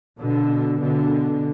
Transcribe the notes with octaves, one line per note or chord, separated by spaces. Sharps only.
B2 D3
B2 D3